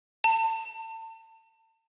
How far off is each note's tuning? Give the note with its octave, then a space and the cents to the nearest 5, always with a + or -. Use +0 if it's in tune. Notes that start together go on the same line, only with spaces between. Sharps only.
A5 +35